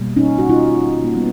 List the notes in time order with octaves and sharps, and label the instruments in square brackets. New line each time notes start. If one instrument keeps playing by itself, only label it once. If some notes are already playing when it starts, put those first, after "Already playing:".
Already playing: [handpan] B2 G3 A#3
C#4 D#4
F#4
D#4 F4
A#3
G3 A#3 B3